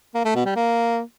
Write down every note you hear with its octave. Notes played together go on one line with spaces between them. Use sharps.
A#3
A3
B2
G3
A#3